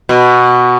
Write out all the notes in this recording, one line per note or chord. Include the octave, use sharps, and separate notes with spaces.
B2